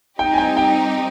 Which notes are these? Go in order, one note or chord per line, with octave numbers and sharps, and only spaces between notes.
G3 C4 D#4 G4 G5
G#5
G5
G5